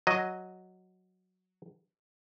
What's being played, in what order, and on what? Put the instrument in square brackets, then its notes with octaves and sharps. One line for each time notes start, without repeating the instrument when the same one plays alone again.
[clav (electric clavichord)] F#3 D#5